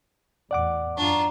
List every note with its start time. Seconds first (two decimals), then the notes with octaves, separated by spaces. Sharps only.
0.51 E2 A2 D5 F#5 D6
0.97 F#2 D4 F4 A#5 C#6